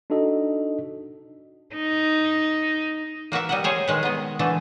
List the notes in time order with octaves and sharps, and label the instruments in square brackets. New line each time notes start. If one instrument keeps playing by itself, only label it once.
[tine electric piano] D4 D#4 F#4 A4 D#5
[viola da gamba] D#4
[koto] A#3 F#4 B4 E5
G3 D#5 F#5
G#4 C5 C#5
D#3 G#3 B4
B3 D#5
D3 E3 A3 A5